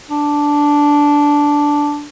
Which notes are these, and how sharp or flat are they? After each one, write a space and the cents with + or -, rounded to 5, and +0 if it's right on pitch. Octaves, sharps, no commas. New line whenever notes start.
D4 -5